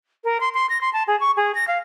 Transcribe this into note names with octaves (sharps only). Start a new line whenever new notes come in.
A#4
C6
C6
A#6
C6
A5
G#4
C#6
G#4
A#6
F5